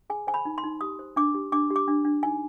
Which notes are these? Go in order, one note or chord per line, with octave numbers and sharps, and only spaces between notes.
G#4 G#5
C5 G#5
B5
D#4
C6
D#4
G4 D#6
C5
D4 D6
G4
D4 D6
G4
D6
D4
D4
D#4 G#5